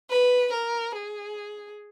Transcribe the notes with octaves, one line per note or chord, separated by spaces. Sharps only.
B4
A#4
G#4